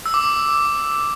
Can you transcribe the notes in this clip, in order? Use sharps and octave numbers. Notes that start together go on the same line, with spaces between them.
E6
D6